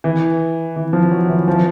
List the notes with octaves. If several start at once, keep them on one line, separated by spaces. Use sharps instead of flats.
E3
E3
F3
F#3
E3
F3